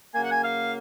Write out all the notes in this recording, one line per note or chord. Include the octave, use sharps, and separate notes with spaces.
C#3 F#3 A#3 G#5
F#5
G#5
F5